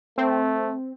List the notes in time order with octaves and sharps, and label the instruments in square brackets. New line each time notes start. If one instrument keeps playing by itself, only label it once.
[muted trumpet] A3 [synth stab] C4